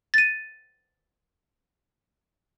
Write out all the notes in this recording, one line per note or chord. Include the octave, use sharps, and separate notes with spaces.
A6 D#7